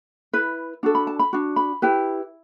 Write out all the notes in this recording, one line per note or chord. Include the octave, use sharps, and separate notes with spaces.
E4 B4
D4 F#4 A4
B5
A5
B5
D4 F#4
B5
E4 G4 B4